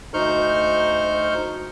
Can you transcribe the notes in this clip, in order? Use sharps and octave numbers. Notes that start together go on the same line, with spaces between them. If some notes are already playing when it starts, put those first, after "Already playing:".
D2 D#4 C5 C#6 F6 G6